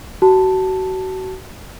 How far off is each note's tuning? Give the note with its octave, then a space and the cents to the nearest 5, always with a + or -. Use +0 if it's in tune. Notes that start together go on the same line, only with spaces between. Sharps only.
F#4 +30 A5 +0